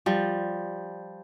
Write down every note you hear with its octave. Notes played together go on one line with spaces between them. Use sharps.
F3 G3